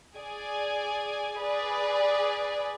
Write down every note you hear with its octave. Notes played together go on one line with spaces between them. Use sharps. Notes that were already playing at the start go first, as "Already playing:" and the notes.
G#4 D5 G#5
G#4 B4 D5